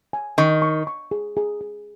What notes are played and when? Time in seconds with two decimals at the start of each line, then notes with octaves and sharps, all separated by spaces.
0.13 G#5
0.38 D#3 C#6
0.62 C#6
0.87 C#6
1.11 G#4
1.37 G#4
1.61 G#4